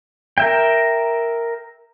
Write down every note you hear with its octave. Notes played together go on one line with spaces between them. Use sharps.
A#4 E5 G5